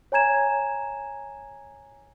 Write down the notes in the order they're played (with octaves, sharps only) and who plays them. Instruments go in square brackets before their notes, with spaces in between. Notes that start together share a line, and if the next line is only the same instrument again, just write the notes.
[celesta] C#5 G#5 A#5 G#6 E7